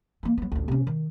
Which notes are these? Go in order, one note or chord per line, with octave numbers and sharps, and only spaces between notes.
E3 A#3
F#3 B3
A1 D2
C3 C#4
D#3